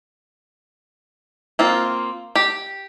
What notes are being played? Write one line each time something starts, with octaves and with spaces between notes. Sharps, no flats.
A#3 C4 F4
G4